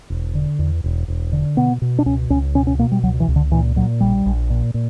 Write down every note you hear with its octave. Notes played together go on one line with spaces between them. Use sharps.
E1
D3
E2
E1
E1
D3
B2 B3
B2
D4
C#2 C#4
C#2 C#4
B2 C#4
C#4
B2 A#3
G3
C#2 F#3
E3
C#2
D3
A#2 E3
A#2 F#3
A#1 G3
A#1
A#2
A#2